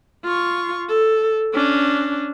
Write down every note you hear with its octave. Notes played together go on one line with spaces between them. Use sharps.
F4 C#6
A4
C#4 D4